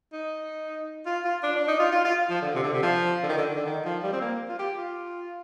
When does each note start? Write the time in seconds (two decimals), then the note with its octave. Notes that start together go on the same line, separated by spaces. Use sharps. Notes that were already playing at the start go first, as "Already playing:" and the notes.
0.13 D#4
1.06 F4
1.24 F4
1.43 D4
1.56 D4
1.68 D#4
1.79 F4
1.92 F4
2.05 F4
2.30 F3
2.42 D3
2.55 C3
2.63 D3
2.73 C3
2.82 F3
3.23 D3
3.29 D#3
3.38 D3
3.56 D3
3.66 D#3
3.85 F3
4.03 G3
4.13 C4
4.21 A#3
4.49 F4
4.59 G4
4.77 F4